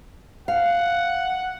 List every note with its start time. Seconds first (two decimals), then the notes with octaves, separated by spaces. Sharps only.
0.48 F5 F#5